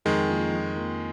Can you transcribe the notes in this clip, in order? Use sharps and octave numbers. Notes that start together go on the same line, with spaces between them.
F2 D#3 G#3
F3 A#3 D#4
F2
F3 A#3